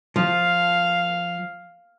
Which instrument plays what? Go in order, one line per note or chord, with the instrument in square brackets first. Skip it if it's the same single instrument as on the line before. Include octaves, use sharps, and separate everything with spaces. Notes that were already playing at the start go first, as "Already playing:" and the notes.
[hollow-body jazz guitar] F3 [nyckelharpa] F5